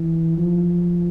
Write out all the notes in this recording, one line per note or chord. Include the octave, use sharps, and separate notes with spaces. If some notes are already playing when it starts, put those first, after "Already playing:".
Already playing: E3
F3